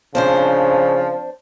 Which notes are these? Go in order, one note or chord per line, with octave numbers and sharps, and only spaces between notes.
C#3 F3 C4 D4 C5